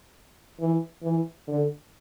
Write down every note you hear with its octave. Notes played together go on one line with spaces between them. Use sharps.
E3
E3
D3